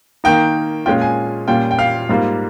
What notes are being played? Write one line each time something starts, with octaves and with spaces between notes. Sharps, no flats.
D#3 A#3 D#4 G5
A#2 G#3 C#4 F4 G5
G#5
A#2 G3 C#4 F4 G5
G5
F5
G#2 G3 A#3 F4